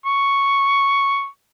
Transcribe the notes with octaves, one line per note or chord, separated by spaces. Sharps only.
C#6